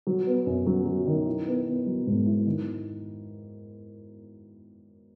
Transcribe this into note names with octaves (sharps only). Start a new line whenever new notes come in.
F#3
B3
F#2
F#3
F#3
D#3
E4
B3
B3
F#3
G#2
E4
D#3